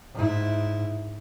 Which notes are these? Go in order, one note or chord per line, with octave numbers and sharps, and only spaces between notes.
G#2 E4